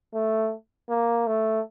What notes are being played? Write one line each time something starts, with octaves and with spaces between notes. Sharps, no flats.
A3
A#3
A3